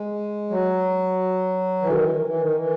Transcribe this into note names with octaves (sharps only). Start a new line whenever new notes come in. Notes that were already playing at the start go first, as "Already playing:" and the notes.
Already playing: G#3
F#3
E3
D3
D#3
E3
E3
E3
D#3
E3